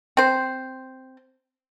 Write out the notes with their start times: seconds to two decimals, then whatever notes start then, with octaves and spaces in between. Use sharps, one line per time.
0.17 C4 C5